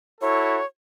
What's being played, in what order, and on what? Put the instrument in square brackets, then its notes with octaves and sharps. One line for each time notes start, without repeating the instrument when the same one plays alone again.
[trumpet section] E4 F#4 A4 [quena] C#5